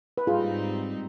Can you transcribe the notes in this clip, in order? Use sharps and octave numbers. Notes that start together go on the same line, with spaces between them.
B4
G#2 G3 C4 D#4 F4 G#4